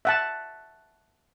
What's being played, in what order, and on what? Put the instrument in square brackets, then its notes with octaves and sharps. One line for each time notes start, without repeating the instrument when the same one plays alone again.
[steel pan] E5 F#5 A5